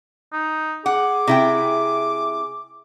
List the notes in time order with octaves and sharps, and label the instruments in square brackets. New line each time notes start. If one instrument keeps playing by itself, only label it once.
[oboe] D#4
[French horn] G#4 [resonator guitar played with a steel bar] F#5 [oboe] D6
[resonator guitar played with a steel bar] C3 E4 G5